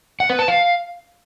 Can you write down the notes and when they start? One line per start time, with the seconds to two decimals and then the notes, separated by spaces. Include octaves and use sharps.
0.20 F#5
0.29 B4
0.39 A5
0.48 F5